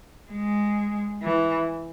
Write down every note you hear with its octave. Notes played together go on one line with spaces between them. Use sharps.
G#3
E3